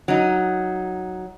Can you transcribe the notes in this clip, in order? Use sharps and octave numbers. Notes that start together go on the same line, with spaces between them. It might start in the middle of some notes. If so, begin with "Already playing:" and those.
F#3 D#4